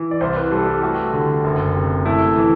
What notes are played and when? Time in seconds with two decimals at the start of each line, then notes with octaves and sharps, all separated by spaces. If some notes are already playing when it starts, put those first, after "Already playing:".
Already playing: E3
0.11 D5
0.21 C2 C5
0.36 B4
0.51 G3 A4
0.67 G4
0.82 A3 F#4
1.13 D3
1.44 F#1
1.75 C3
2.06 A3 E4
2.36 E3